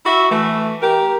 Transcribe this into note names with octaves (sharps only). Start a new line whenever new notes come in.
E4 F#4 E5
E3 A3
G4 A#4